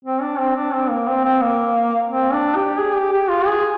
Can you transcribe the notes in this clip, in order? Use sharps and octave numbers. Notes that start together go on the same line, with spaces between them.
C4
D4
C4
D4
C4
A#3
C4
C4
A#3
C4
D4
G4
G#4
G4
G4
F4
G#4